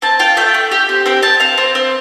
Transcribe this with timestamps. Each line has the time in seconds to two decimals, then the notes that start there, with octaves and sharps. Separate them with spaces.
0.02 C4 A5
0.19 F4 G5
0.37 A3 G5
0.54 A3
0.71 G4
0.89 C4
1.06 C4 G5
1.23 C4 A5
1.40 C4 F5
1.58 C4
1.75 C4